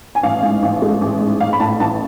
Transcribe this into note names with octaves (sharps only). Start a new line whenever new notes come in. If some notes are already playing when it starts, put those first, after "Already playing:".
G#5
A1 F5
G#2
A1
G#3
A1
G#2
A1 F5
B5
A2 A5
A1 A5